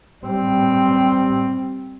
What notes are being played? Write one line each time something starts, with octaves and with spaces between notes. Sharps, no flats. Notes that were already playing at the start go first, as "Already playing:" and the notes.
G3 C4